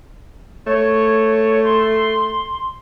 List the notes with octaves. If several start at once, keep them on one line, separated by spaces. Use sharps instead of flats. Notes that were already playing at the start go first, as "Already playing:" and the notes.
A3 C#5
C6